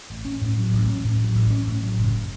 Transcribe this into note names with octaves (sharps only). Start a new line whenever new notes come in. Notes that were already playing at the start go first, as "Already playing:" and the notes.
A1
C#4
A2
F#3
A1
C#4
A2
F#3
A1
C#4
A2
F#3
F#1